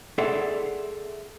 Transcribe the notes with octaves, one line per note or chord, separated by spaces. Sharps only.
G#4 A4 D5 E5 F#5 C6